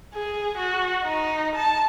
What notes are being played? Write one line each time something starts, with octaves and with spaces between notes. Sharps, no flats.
G#4
F#4
D#4
A5